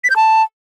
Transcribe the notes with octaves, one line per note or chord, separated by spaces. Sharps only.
B6
G6
A5